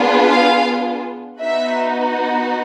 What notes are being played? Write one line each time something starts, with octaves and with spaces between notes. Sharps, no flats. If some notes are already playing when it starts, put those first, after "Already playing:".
Already playing: B3 D4 F4 G#4
F5
B3 D#4 F#4 E5